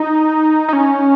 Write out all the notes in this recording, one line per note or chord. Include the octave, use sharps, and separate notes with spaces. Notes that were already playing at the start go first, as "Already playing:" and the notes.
Already playing: D#4
D#4
C#4